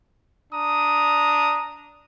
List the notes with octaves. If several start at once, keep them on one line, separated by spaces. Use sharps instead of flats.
D4 A#5 D#6